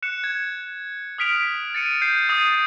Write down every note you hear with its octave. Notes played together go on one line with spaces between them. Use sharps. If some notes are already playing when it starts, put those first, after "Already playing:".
F#6 C#7 E7
G#6
D#6 F6 B6 D7 F7
A6 C#7 D#7
G6 C7 C#7
D#6 A6 D#7